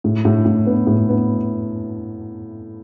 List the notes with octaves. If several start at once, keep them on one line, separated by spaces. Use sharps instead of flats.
A2
A2
A2
B3
A2
B3